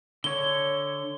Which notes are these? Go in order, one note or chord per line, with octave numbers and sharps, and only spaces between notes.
D3 C#5 G7